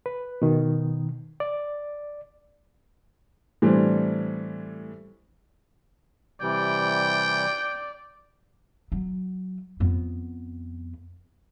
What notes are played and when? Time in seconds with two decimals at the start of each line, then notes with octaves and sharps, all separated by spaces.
0.06 B4
0.42 B2 D#3
1.40 D5
3.62 A2 E3 G3 C4 D4
6.42 C3 E3 G3 D5 G5
8.92 F#3
9.80 F2 B3